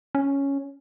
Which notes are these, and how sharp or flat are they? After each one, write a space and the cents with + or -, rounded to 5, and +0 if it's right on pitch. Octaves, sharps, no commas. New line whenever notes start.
C#4 +0